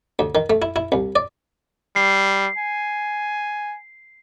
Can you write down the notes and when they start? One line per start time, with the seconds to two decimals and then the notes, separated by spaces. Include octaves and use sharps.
0.19 D2
0.35 D#3
0.50 A3
0.62 E4
0.76 E4
0.92 C2
1.16 D5
1.96 G3 C7
2.58 G#5